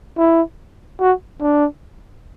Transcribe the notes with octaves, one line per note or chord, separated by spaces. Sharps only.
E4
F#4
D4